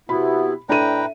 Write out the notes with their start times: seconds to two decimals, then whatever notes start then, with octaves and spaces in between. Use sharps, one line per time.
0.09 C3 B3 E4 F#4 B5
0.69 A2 D4 A4 B4 E5 G5 A#5 D#7